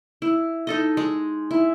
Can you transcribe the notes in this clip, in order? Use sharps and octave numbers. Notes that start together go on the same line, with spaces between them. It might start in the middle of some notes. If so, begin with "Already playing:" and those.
E4
D#4 A4 D#5
G#3
E4